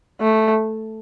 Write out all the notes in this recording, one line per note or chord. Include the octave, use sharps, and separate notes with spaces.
A3